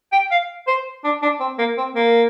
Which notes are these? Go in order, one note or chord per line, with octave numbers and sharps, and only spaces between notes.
G5
F5
C5
D4
D4
C4
A#3
C4
A#3